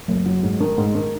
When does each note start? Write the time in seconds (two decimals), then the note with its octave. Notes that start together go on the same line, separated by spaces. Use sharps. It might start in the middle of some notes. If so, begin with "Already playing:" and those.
0.08 F#1
0.26 F#3
0.43 G#2
0.60 D#3
0.78 G#2
0.95 D#3